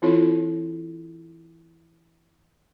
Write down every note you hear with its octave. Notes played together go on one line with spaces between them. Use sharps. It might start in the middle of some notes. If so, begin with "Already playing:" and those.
E3 C4 E4 F4 A4 C#5